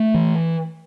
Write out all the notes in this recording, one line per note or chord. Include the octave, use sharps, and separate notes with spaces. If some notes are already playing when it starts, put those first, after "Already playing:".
Already playing: A3
E3